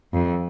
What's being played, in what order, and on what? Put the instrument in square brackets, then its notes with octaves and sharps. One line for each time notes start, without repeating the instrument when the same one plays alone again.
[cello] F2